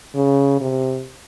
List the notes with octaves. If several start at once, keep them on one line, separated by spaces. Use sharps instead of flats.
C#3
C3